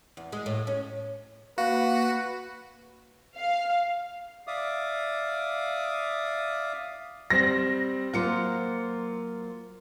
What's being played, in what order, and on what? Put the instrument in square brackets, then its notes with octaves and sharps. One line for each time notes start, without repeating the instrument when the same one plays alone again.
[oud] E2
G#3
A2
C#4
[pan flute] A#3 [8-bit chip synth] F#4 [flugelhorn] B4 [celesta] F5
[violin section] F5
[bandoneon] D5 E5 F5 D6 D#6
[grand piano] G3 C4 [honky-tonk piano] A#6
[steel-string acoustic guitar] F#3 A#3 C5 [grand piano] F4 C#7